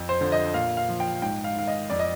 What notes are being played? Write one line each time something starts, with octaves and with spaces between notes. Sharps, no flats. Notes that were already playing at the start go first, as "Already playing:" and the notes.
Already playing: F2
C5
D3 F3
D#5
A#2 F5
F5
F3
G5
G#2 G5
F5
D#3 F5
D#5
F2 D5
D#5